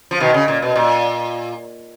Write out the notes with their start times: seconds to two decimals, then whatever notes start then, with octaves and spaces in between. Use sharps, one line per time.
0.11 F3
0.20 B2 D#3
0.34 C#3
0.48 A#2
0.62 B2
0.76 A#2